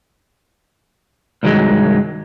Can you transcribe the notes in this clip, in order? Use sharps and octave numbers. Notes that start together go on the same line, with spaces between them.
C2 G2 D#3 F#3 G#3